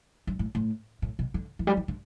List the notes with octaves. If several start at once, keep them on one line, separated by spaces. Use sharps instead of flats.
G2
A2
A2
A2
B2
D3
E3
G3
E3
D3